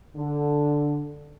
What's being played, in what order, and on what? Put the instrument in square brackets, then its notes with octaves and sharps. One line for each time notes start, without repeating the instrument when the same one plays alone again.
[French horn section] D3